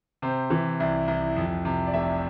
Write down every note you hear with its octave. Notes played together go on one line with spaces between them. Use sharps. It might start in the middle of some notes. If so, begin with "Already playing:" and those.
C3 C5
E3
C2
C2
F2
C3
D5
F1 E5